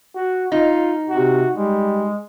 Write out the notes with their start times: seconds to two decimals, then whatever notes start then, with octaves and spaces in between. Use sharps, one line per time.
0.15 F#4
0.52 D#4 F4
1.10 C3 F#4
1.56 G3 G#3